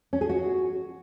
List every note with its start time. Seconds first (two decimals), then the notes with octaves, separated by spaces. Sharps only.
0.13 C#4
0.21 G#4
0.29 F#4